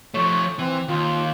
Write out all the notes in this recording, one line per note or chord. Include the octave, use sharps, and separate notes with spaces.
F3 A3 C#5
E3 C4
D#2 F4